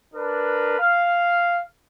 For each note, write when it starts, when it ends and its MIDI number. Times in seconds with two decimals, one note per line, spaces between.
0.14 0.78 62
0.14 0.78 70
0.14 0.78 71
0.78 1.60 77